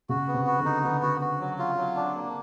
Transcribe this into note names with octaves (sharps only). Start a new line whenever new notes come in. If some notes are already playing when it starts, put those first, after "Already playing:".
C#3 F#4
B3
C3
F#4
D3
D#4
D3 B3
F#4
F#4
F#3
F4
F#3
D4
A#3